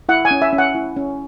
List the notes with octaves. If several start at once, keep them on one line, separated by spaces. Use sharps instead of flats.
E4 F#5
G#5
C#4
E5
C#4
F#5
E4
C#4